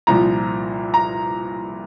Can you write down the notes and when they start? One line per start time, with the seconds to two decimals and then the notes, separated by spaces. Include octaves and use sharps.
0.07 C2 A#2 F3 A#5
0.94 A#5